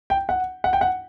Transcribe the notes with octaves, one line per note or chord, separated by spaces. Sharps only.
G5
F#5
F#5
G5
F#5